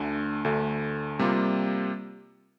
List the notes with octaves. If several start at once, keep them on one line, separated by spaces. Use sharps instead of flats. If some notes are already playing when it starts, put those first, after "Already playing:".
Already playing: D2 D3 A3
D2 D3 A3
C3 G3 A#3 F4